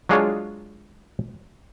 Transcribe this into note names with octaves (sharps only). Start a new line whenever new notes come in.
F#3 G#3 D4 F4 G#4 C#5